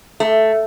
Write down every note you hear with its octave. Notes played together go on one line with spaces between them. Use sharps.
A3